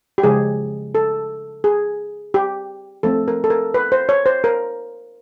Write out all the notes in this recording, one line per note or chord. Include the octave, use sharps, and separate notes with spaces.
G4
C#3 F3 G#3 G#4
A4
G#4
G4
F3 A3 C4 A4
A#4
A4
A#4
B4
C5
C#5
C5
A#4